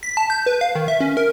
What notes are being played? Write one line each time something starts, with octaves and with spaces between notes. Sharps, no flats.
B6
A5
G6
B4
F5
D#3
E5
C#4
A#4